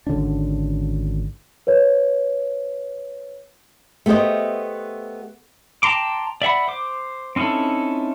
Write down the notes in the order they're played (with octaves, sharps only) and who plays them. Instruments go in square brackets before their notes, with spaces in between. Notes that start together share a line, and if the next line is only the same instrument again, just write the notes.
[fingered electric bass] G#1 D3 C#4 D4
[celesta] B4 C#5
[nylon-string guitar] A3 B3 G4 C5 D#5
[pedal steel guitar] G5 A5 A#5 C6 D6
D5 E5 F#5 B5
C5 D6
C4 C#4 D#4 E4 A4